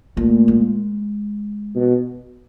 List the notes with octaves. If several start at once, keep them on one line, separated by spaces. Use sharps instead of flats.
A#2 A3
G#3
B2